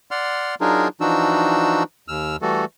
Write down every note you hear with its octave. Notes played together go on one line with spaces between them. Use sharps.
D5 F#5 C6 F6
F#3 D4 D#4 F4 G#4 A#4
E3 F3 D4 D#4 F#4 E6
D#2 E6 F6
E3 G3 A3 F#4 A4